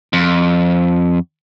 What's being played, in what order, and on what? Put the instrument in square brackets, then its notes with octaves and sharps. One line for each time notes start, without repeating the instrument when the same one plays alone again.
[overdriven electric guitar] F2